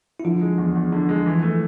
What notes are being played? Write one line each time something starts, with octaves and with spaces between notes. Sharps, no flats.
E4
D3 F3 F4
G#3
E2
E2
D3
G#3
E3
A3